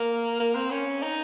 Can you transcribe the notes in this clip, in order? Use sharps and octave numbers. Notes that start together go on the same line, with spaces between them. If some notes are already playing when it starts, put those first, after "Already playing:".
Already playing: A#3
A#3
C4
C#4
D#4